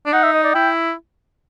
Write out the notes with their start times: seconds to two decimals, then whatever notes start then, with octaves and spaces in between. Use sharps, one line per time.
0.06 D4
0.12 D#4 F#5
0.23 E5
0.33 D#5
0.44 D5
0.54 E4 G5